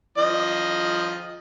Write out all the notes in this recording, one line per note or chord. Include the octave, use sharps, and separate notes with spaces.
F3 D#5